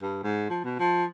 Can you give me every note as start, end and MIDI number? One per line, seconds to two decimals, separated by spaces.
0.02 0.23 43
0.23 0.48 44
0.49 0.59 53
0.64 0.78 47
0.79 1.04 53